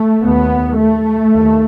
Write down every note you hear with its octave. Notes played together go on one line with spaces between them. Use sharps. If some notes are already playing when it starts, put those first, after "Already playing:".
Already playing: A3
D#2 B3
A3
D#2